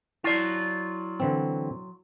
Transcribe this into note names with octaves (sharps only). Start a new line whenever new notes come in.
F#3 E4 F4 D5
D3 E3 C4